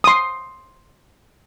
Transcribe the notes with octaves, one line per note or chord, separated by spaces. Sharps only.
C6 D#6